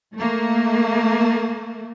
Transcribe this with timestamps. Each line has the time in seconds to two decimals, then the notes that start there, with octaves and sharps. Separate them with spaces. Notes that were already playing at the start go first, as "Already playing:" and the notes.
0.14 A3 A#3